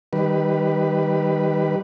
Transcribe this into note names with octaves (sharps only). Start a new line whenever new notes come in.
D#3 G3 B4